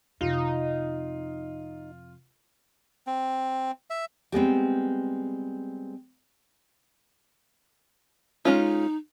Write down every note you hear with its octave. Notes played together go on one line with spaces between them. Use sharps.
F2 C3 D#4 F4
C4
E5
G3 G#3 B3 C4
G#3 C#4 D#4 F4